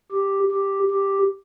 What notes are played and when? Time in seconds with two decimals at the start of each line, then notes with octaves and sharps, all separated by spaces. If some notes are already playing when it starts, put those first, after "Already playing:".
0.12 G4
0.52 G4
0.91 G4